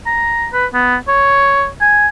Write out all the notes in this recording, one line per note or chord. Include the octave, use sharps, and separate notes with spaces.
A#5
B4
B3
C#5
G#5